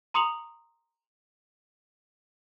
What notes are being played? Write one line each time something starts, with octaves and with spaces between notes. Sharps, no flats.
A#5 C6 D#6 C#7 F7 F#7